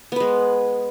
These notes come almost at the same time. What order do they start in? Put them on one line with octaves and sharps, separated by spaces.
B3 B4 G#3